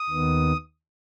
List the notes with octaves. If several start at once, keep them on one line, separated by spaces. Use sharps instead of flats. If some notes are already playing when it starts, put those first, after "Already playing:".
Already playing: D#6
D#2 D#3 B3